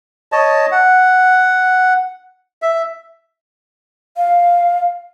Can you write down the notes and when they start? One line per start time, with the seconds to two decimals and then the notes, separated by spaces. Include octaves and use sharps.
0.32 C#5 D#5 A5
0.72 F#5
2.62 E5
4.17 F5